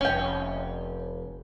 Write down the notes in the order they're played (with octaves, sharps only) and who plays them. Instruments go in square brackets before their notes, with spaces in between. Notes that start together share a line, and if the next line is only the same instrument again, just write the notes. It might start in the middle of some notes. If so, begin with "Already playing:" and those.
[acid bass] F1 [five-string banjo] C#4 G5